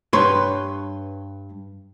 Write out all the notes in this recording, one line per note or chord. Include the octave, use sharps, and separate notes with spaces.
G2 B4 C#5 C6